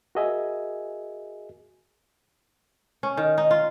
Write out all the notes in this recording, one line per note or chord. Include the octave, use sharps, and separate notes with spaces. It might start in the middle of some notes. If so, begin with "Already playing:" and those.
F#4 G#4 A#4 D#5 E5 G#5
C#4
D#3
D#4
F4